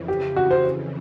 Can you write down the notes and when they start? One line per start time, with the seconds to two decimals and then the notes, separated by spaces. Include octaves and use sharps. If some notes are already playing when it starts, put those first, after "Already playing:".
Already playing: F2 C#3 E3
0.08 G4
0.36 F#4
0.51 C5